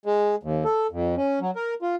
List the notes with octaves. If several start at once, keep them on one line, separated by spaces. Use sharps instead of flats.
G#3
D#2
A4
F2
C#4
F#3
A#4
F4